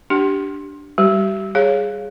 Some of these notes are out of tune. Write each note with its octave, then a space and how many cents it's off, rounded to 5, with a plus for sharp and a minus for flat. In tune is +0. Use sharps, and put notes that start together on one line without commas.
D4 +0 G4 -10 F#5 +40
G3 +0 G4 -40
G#4 +0 C#5 +0 F5 +0